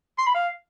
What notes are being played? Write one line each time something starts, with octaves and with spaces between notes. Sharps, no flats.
C6
B5
F5